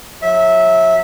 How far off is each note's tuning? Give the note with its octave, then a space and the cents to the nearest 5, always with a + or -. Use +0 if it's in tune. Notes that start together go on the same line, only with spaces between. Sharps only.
F#3 -30 E5 -15